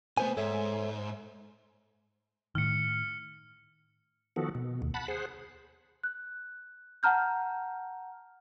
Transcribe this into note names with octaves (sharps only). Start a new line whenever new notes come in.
C3 A3 B3 C5 G#5
G#2 A4 C#5 E5
A2 D#3 F6 C#7
D#3 F3 B3 F#4 A4
B2
D#2
F#5 A5 B5
G#4 C5 F#5
F#6
F#5 A5 A#5 F6 G6